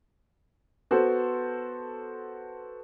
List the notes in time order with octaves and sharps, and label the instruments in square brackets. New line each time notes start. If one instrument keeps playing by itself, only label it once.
[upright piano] B3 F#4 A4 C5